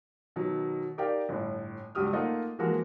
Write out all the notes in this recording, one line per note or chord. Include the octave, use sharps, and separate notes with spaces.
B2 D#3 F#3
D#4 G4 A#4 D5 F5 G5
G1 A2
C#2 G2 F#3 G4 D#6 F6
A3 A#3 D#4 F4 D#5 F#5
E3 F3 G#3 A#3 F#4 A#4